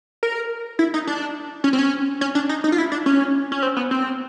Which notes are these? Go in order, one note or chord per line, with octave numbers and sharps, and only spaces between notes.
A#4
E4
D#4
D4
C#4
C4
C#4
C#4
D4
D#4
D#4
F4
E4
D4
C#4
C#4
C4
B3
C4